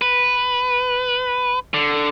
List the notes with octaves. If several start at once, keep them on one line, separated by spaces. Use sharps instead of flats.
B4
D3